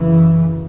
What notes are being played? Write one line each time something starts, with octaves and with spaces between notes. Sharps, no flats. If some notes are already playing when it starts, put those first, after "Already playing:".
Already playing: F#2 C#3 E3